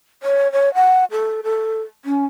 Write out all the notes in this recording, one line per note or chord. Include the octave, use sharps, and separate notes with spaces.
C#5
C#5
F#5
A4
A4
C#4